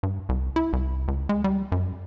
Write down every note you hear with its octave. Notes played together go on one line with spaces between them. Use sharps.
G2
C2
E4
C2
C#2
G#3
G3
F#2